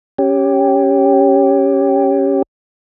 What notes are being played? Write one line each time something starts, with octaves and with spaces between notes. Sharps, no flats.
C#4 G4